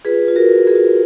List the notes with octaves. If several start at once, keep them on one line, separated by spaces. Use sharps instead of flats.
F4 G#4 B4
F4
F#4 A#4
F4
G#4
F4